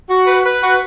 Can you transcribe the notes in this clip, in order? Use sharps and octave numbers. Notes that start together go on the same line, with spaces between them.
F#4
B4
B4
F#4